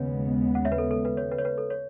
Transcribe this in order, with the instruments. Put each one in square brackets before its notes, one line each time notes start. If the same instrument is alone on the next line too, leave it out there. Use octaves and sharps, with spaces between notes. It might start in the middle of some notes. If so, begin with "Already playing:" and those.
Already playing: [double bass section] D#2 C#3 G#3 B3 [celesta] B4 C#5
[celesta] F#5
C#5 E5
B4
A4
A4
B4
C#5
B4
C#5
B4
A4
C#5